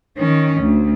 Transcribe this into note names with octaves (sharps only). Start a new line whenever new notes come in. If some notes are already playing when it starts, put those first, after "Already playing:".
D#3 C#4
D2